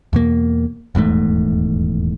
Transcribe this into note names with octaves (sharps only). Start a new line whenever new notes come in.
E2 B2 A#3
D#1 E2 G#2 A3